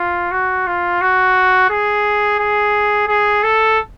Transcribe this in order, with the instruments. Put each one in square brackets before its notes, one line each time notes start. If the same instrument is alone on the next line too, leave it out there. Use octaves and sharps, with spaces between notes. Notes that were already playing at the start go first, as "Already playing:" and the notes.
Already playing: [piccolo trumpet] F4
F#4
F4
F#4
G#4
G#4
G#4
A4